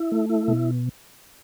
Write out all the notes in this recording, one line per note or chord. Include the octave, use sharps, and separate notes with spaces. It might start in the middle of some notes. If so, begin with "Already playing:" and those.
Already playing: E4
A3
E4
B2